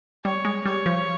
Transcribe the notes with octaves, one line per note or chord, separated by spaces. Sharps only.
G3 C#5
G#3
G3 C#5
F3